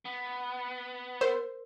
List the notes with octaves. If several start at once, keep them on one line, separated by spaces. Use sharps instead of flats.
B3
A#4 C5